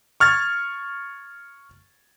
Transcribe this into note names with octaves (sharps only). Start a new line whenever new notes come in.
C#6 F6 G#6 A6